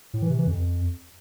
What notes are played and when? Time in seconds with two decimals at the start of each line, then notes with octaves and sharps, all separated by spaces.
0.14 A2
0.22 E3
0.30 C3
0.39 E3
0.47 F2